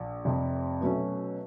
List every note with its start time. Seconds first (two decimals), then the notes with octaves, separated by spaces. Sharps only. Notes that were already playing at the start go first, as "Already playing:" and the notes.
Already playing: A#1
0.25 F1 F2 C3
0.81 B2 F#3 A3 C#4